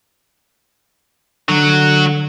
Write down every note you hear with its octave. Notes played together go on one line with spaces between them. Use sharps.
D3 F#3 F#4